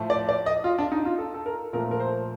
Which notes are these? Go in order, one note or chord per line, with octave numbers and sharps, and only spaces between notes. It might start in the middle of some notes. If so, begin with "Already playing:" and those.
Already playing: A2 F3 A3
D5
D5
D#5
F4
D4
D#4
F4
A4
A4
A#4
A#2 F3 A3 A#4
A#4
C5